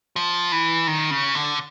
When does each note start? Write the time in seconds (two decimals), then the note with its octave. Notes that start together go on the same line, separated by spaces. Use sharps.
0.16 F3
0.52 E3
0.87 D#3
1.11 C#3
1.35 D3